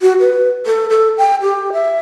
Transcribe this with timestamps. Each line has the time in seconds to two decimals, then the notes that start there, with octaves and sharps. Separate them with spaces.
0.02 F#4
0.20 B4
0.66 A4
0.90 A4
1.18 G5
1.42 G4
1.73 E5